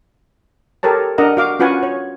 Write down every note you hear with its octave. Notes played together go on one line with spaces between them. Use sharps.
G4 A4 A#4 C#5 A5
D4 A#4 D#5 F#5 A#5
F#4 F5 D6
C#4 F4 F#4 B4 F#5 G#5
C#5